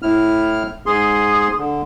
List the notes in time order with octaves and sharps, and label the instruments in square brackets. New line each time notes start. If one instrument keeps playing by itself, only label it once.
[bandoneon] A2 E4 F6
[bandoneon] G#2 G#4 C6 [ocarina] D#6
[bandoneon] D3